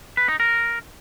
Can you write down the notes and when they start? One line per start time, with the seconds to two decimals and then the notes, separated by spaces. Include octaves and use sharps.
0.17 B4
0.28 D#4
0.40 A#4